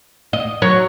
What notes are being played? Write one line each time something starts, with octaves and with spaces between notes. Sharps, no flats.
D#5
F#3 C#5